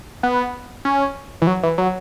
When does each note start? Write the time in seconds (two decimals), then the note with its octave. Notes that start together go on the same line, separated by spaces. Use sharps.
0.23 B3
0.85 C#4
1.42 E3
1.47 F#3
1.63 E3
1.78 F#3